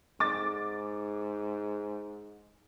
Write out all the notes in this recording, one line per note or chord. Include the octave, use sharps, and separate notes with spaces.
G#2 D6 A6